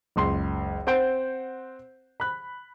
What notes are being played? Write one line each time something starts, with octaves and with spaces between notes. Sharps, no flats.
F#1 C#2 C6
C4 C5 F#5 C6 G6 D7
B5 F#6